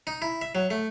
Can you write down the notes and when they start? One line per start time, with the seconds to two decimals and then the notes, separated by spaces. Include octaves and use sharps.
0.07 D#4
0.22 E4
0.42 E5
0.55 F#3
0.70 A3